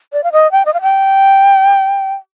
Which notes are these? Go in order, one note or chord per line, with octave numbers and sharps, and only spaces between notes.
D5
F5
D#5
G5
D#5
F5
G5